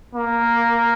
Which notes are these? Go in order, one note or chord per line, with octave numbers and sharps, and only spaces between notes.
A#3